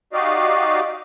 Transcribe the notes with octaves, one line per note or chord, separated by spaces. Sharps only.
D#4 F#4 G4 D5 D#5 F5